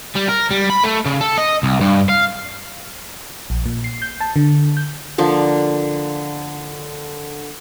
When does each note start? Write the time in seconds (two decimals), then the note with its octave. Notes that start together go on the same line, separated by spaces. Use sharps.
0.16 G3
0.29 A#4
0.51 G3
0.70 B5
0.84 A3
1.05 C#3
1.21 A4
1.38 D#5
1.63 C2
1.81 G2
2.09 F5
3.50 A#1
3.66 A#2
3.84 C7
4.02 G6
4.21 A5
4.36 D3
4.77 G6
5.18 D3 F3 A#3